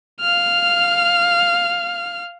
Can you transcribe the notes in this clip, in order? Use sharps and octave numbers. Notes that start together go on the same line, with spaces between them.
F5 F6